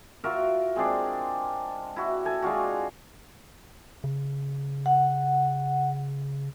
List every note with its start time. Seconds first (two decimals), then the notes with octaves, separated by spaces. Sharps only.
0.24 F4 F#4 A#4 E5
0.76 G#3 C4 D4
1.96 E4 F#4
2.25 A4 G#5
2.42 G#3 D4 F4 F#4
4.04 C#3
4.86 F#5